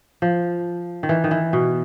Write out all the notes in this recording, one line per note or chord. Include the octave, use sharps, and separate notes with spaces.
F3
D#3
E3
D#3
E3
B2